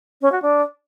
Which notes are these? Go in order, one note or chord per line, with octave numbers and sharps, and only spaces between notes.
C#4
F#4
D4